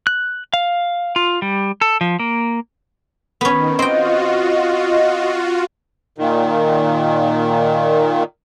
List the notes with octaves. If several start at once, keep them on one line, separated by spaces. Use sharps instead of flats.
F#6
F5
F4
G3
A4
F3
A#3
D#3 B3 C#4
C4 F4 F#4 D#5 G5
A#2 D#3